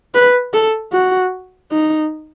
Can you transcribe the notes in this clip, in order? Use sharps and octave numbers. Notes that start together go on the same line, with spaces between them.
B4
A4
F#4
D#4